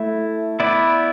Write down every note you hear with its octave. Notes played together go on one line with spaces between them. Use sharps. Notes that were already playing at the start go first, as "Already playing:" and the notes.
Already playing: A3 E4
B3 E4 B4 D5